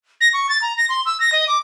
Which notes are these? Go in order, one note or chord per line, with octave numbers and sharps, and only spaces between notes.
A#6
C#6
A6
A#5
A#6
C6
E6
A#6
D#5
D6